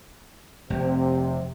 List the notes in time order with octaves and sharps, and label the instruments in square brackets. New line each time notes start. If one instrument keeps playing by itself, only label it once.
[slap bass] F1 [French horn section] C3